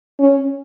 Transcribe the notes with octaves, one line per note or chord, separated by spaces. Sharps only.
C#4